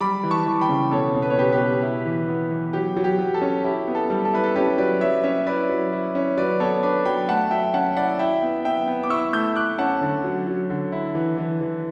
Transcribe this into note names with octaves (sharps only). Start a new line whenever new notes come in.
G3 B5 D6
E3
A5 C#6
E3
G5 B5
C#3
B2 A4 C#5
B2
B4
C#5
B2 G4 B4
G4 B4
B2
E4
E3
B3
E3
F#3 G4
F#3
G4
F#3
A4
C#4
E4 G4
B3
A4
G3
A4
E4 B4
A4
C#4 G4 B4
F#3 B4 D5
F#3 C#5 E5
C#4 C#5 E5
E4 B4 D5
F#3
E4
C#4
F#3 B4 D5
B3 A4 C#5
D4 B4 D5
F#3 G5 B5
A3 F#5 A5
F#3 E5 G5
C#4 F#5 A5
E4 D5 F#5
E4 E5 G5
B3
B3 E5 G5
B3
D6
E4 C#6 E6
A3 E6 G6
A3 D6 F#6
C#4 F#5 A5
D3
F#3
F#3
D3
E4
E3
E3
E3